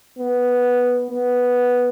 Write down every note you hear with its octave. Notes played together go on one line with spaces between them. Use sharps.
B3
B3